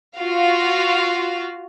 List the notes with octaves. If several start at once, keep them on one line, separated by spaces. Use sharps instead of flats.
F4 F#4 F5